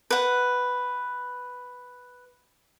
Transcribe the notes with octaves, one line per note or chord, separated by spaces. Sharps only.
B4 F#5